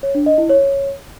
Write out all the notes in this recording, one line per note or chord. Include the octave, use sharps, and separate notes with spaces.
C#5
D4
D#5
E4
C#5